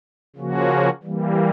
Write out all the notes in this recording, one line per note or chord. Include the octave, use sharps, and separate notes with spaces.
C#3 F3 A#3 C#4 F#4
E3 G3 A#3